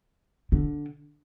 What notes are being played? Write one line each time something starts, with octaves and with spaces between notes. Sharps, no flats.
D3